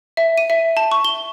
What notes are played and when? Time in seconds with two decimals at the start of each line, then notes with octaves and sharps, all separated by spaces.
0.17 E5
0.38 D#7
0.50 E5
0.77 A5
0.92 C#6
1.05 G7